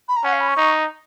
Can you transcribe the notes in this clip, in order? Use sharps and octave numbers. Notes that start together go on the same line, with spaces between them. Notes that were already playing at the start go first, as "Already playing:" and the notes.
B5
A#5
C#4 F#5
F5
B5
C#6
D#4